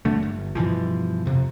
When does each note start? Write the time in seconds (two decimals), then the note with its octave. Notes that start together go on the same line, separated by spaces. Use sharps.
0.05 F#2 D3 A3
0.23 G1
0.55 G2 B2 E3 F3
1.25 F2 C3